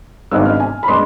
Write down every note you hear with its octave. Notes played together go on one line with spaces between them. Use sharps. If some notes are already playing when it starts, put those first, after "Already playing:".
G#1 G#2 G#3 B3 D4 E6
F6
G#5
B5
G#3 B3 D4 C6